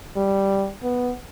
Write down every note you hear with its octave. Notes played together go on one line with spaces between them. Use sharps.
G3
B3